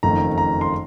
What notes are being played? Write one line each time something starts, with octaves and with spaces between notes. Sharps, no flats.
F#1 F2 D#3 A3 A#5
A#5
C6